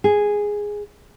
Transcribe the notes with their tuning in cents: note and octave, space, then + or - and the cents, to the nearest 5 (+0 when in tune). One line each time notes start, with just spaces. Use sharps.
G#4 -5